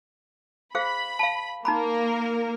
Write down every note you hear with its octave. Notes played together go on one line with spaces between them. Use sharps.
G#4 C5 F5 B5
F5 A5
A#3 D#4 A#4 A#5 B5